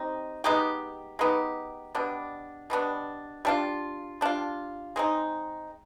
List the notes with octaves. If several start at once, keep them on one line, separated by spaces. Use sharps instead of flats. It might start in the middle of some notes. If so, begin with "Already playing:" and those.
Already playing: G3 C4 D#4
G#3 B3 D#4 G4
G#3 B3 D#4 G4
B2 G3 B3 D4
B2 G3 B3 D4
G3 D4 F4
G3 D4 F4
G#3 C4 D#4